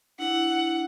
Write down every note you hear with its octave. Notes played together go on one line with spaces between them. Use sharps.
D4 E4 F#5